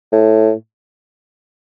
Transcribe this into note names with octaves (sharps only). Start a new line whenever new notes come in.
A2